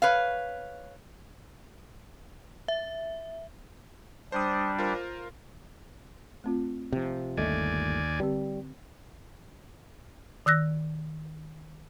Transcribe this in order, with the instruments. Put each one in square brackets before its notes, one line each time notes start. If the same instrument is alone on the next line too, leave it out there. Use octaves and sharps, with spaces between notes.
[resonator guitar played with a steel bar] B4 C#5 F5
[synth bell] E5
[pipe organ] G3 D4 [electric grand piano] C5 D#6
[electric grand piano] F4 A#4 C5
[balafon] A3 C4 F4
[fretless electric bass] C3 F3
[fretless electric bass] G1 A3 [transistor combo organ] D#2 D5 G#5 [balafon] D#5
[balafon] D3 C4 G4 [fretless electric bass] G3
[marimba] D#3 E6 F#6 A#6